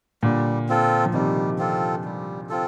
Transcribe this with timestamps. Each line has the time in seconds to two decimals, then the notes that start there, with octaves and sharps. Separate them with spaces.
0.23 A#2 D3 G3
0.69 C4 F4 A4
1.06 F3
1.14 C3 D#3 G3
1.59 C4 F4 A4
2.04 G3
2.49 C4 F4 A4